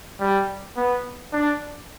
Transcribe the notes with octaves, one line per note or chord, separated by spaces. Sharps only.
G3
B3
D4